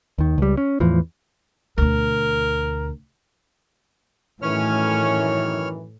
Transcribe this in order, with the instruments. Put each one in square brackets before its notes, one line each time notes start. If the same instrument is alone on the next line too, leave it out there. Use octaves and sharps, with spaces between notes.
[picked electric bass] D#2 D#3
C#2 G3
C#4
E2 A2 E3 F3
[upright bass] D2 B2 [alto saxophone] A#4
[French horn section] F#2 D#3 E3 [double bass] A2 A3 [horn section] C#4 [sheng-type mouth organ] C#5 F6